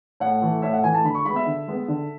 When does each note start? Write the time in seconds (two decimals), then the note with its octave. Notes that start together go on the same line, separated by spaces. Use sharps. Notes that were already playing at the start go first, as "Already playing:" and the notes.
0.20 A2 F#5
0.42 E3 A3
0.62 A2 E5
0.73 F#5
0.84 E3 A3 G#5
0.94 A5
1.04 D3 B5
1.15 C#6
1.25 G#3 B3 B5
1.36 E5
1.46 D3
1.68 G#3 B3
1.88 D3